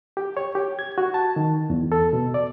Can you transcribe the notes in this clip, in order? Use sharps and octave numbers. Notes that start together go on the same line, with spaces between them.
G4
C#5
G4
G#6
F#4
A5
D#3
E2
A4
B2
D5